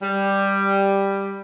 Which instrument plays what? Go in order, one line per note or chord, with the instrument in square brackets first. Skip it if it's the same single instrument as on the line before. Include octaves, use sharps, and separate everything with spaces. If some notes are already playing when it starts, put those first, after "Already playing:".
[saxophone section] G3